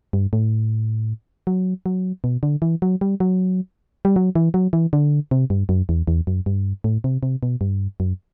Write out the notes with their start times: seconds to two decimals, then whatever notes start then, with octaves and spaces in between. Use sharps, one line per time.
0.13 G2
0.33 A2
1.47 F#3
1.86 F#3
2.24 B2
2.43 D3
2.62 E3
2.82 F#3
3.01 G3
3.20 F#3
4.05 G3
4.16 F#3
4.35 E3
4.54 F#3
4.73 E3
4.93 D3
5.31 C3
5.50 G2
5.69 F#2
5.89 E2
6.07 E2
6.27 F#2
6.46 G2
6.84 A2
7.04 C3
7.23 C3
7.43 B2
7.61 G2
8.00 F#2